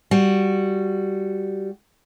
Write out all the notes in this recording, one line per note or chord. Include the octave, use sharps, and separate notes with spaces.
G3 F#4